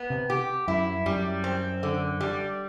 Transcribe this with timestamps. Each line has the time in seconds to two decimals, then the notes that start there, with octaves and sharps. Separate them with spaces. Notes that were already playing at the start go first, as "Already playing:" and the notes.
Already playing: B3
0.10 C3
0.30 G4
0.68 F#2 E4
1.06 F#2 G3
1.44 C4
1.83 D3
2.21 G3